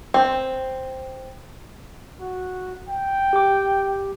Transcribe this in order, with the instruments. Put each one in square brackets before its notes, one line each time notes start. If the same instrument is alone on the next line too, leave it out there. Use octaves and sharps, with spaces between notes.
[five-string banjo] C4
[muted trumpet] F#4
G5
[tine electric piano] G4 D6